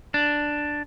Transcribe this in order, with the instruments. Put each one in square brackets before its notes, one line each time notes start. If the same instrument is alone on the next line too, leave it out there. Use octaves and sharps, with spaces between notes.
[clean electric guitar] D4